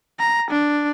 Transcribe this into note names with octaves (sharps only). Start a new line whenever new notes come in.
A#5
D4